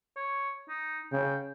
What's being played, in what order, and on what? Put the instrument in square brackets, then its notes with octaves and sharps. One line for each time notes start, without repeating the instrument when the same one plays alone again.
[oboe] C#5
D#4
[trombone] C#3 [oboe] G5